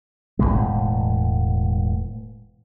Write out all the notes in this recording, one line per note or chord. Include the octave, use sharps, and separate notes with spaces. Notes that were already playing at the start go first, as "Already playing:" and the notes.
E1 F#2 A2 G#3